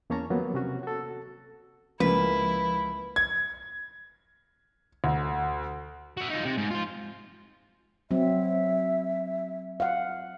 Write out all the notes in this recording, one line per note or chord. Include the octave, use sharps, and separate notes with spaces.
E2 A#3 C#4 C#5 A5 A#5
D#3 F3 F#3 A#3 B3
C3 C#4 F#4
F#4 A4
C#2 F3 A#3 E4 B4
G#6
D2
F#4 E5
D#4 F4
C3
G#2
F4 C5
F#3 C4 E5
F5 F#5